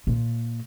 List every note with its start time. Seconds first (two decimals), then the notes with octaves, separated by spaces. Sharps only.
0.07 A#2